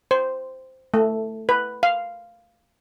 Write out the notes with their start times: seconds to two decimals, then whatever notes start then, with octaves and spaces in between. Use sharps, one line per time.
0.11 C5
0.94 A3
1.49 B4
1.83 F5